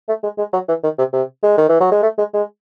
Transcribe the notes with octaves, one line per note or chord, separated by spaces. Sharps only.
A3
G#3
G#3
F#3
E3
D#3
C3
C3
G#3
D#3
E3
F#3
G#3
A3
G#3
G#3